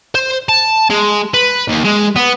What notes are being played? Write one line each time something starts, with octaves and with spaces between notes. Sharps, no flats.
C5
A5
G#3
B4
D#2
G#3
B3